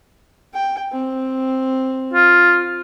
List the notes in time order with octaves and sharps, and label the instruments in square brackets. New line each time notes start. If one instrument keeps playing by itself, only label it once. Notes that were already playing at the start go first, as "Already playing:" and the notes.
[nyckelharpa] G5
C4
[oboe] F4